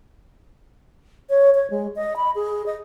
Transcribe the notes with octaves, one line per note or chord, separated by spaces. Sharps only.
C#5
C#5
G#3
D#5
B5
G#4
D#5